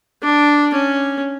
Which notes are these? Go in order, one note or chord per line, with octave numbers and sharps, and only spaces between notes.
D4
C#4